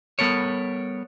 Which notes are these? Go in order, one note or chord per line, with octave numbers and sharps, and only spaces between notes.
G3 B3 A4 A#4 C#5